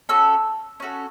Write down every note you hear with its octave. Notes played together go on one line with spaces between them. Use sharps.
C#4 F#4 A4 E6
C#4 F#4 A4